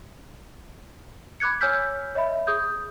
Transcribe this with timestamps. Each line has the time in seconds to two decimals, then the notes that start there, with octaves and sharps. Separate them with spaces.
1.40 B5 D6 F#6 G#6 C#7
1.61 C#5 G#5 E6 F6 G6 B6
2.15 C#5 D#5 E5 B5
2.47 G#4 D#6 G6